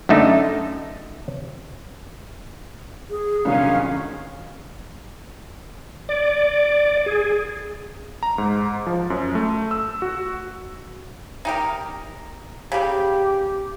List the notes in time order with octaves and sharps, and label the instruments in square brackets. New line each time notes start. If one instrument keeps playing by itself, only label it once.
[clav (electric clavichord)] F#2 D3 A3 D#4
[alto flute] G#4
[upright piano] C2 D3 F#3 [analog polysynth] A#2 D#3 C#4 [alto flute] F5
[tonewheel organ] D5
G#4
[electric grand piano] A#5
G#2
F3
F#2
A3
E6
F#4
[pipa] D#4 G4 A#4
[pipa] C#3 G3 [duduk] G4